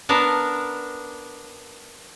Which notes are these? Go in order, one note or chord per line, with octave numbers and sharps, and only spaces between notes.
B3 D4 A#4 A5